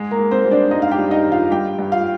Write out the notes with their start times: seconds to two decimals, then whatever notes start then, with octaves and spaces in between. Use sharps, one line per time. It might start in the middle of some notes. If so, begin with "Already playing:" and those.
Already playing: G#2 G#3 G#4
0.11 A#3 A#4
0.18 G#2
0.31 C4 C5
0.45 G3
0.51 D4 D5
0.71 G#2 D#4 D#5
0.82 F5
0.91 G4 G5
0.98 G3
1.11 D#4 D#5
1.25 D#3
1.32 F4 F5
1.51 G2 G4 G5
1.79 G2
1.92 F4 F5